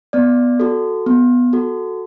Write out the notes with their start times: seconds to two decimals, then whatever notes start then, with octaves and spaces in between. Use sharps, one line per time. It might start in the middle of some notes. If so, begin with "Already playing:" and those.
0.13 B3 D5
0.60 F#4 A4
1.06 B3
1.53 F#4 A4